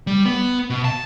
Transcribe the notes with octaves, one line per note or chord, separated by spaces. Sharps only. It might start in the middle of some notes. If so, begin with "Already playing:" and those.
G3
B3
B2
A5